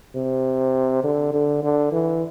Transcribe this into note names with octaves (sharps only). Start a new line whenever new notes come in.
C3
D3
D3
D3
E3